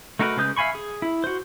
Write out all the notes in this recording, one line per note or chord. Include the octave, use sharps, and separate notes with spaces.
A3 D#4 F#4 A#4 B4
C#3 G#3 B4 D#6 G6
E5 F5 G#5 B5 C#6
G#4
E4
F#4 C5